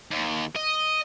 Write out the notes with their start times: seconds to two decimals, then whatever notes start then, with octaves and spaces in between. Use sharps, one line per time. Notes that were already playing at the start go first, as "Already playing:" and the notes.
0.11 D#2
0.56 D#5